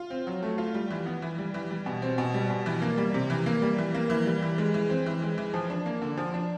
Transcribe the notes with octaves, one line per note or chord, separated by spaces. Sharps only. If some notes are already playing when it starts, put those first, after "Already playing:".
Already playing: F4
C4
F#3
A3
F4
G3
E3
B3
E3
G3
E3
G3
B2
C4
B2
G3
B2
E3
A#3
G3
C3
E3
A#3
G3
E3
A#3
E3
G3
E3
G#3
E3
C4
E3
G#3
E3
F3
D4
A#3
D3
F3
D4